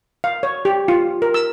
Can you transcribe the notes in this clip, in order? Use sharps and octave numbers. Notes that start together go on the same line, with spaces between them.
F5
C#5
G4
F4
A#4
E6